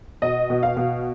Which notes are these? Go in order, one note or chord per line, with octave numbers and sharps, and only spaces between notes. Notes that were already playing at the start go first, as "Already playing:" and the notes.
B2 D#5
B2
F5
B2